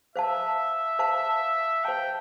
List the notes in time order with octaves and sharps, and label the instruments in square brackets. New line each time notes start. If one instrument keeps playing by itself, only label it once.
[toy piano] C5 F5 A5 [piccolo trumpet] E5
[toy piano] C5 F5 A5
[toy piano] C5 F5 A5 [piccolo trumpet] G5